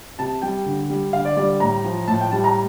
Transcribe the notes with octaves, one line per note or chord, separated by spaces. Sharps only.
C3 A5
G3 G5
D3
G3
D3 F5
D5
G3 D5
D5
A2 A#5
F3
A2 A5
G5
G3 A5
A#5